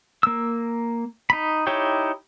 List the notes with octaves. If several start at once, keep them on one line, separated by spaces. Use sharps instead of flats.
A#3 E6
D#4 B5
D#4 E4 G4 C#5 G5